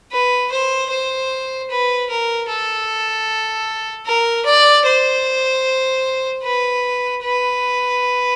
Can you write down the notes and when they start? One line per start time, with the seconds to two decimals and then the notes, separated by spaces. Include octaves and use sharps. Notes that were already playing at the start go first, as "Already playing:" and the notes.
0.12 B4
0.52 C5
0.90 C5
1.70 B4
2.10 A#4
2.49 A4
4.06 A#4
4.46 D5
4.86 C5
6.43 B4
7.22 B4